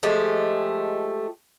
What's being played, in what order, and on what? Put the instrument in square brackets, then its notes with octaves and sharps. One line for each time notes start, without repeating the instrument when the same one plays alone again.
[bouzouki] F3 G#3 A3 G4